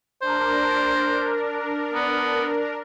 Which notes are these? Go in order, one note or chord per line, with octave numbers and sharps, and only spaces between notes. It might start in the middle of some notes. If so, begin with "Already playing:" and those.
D4 A#4 C5
B3